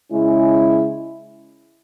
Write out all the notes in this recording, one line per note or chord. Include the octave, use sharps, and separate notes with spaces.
C#3 G#3 C#4 E4